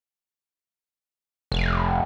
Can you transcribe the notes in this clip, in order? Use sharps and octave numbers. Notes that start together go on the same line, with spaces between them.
F1